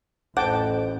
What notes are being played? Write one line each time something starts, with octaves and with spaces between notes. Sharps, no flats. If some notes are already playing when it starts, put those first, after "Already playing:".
A1 F2 F#5 G5 A5 D6